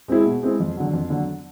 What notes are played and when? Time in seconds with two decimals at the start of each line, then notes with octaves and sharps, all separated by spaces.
0.08 G#3 C4 E4 G#4
0.25 B2
0.43 G#3 C4 E4 G#4
0.60 F2
0.77 D3 F#3
0.93 F2
1.10 D3 F#3